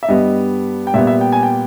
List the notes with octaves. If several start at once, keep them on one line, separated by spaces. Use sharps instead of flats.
E5
G2 G3 B3 D#5
G5
A#2 G3 B3 E5
E5
G5
G#5
G5